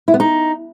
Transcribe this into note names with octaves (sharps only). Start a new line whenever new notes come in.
E4
B3
D#4